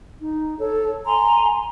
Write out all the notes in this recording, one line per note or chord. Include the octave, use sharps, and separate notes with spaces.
D#4
A4 C#5
G#5 A#5 C6